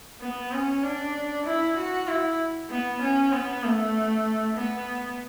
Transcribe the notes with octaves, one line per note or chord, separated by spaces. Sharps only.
B3
C#4
D4
E4
F#4
E4
B3
C#4
B3
A3
B3